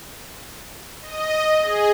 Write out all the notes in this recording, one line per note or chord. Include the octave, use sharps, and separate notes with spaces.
D#5
G#4